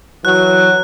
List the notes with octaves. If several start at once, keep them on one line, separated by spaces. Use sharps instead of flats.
E3 F#3 F#6